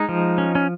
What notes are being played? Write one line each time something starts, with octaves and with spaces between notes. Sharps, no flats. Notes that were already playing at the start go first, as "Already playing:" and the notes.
Already playing: G#3 D#4
F3
C#4
C#4